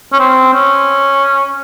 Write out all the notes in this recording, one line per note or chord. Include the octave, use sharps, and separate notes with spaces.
C#4
C4
C#4